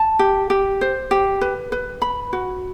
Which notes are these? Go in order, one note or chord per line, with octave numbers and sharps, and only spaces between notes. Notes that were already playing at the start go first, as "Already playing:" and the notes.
Already playing: A5
G4
G4
C5
G4
B4
B4
B5
F#4